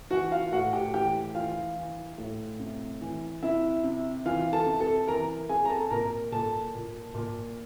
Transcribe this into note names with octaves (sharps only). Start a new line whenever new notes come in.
E3 F#4 F#5
F4 F5
A2 F#4 F#5
G4 G5
E3 G4 G5
E3 F4 F5
E3
A2
C3
E3
C3 E4 E5
C3
E3 F4 F5
A4 A5
C3
A4 A5
E3 A#4 A#5
C3 G#4 G#5
A#5
A4 A5
A#2 A#4 A#5
A#2 A4 A5
A#2
A#2